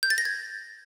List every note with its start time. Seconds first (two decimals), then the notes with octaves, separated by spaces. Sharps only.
0.03 G6
0.10 A6
0.18 A#6
0.25 G#6